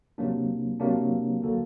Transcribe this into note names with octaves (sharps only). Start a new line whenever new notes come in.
C3 F#3 A#3 D4
C3 F#3 A#3 D4
D3 F#3 A#3 F#4 A4